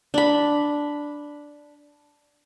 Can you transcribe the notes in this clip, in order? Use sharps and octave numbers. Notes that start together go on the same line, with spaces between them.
D4 B5